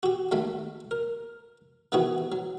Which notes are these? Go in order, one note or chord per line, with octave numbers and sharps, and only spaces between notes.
F#4 G4
D#2 F#3 G#3 A3 B5
A#4
C3 D#3 E3 B3 F#4 G#4
F#3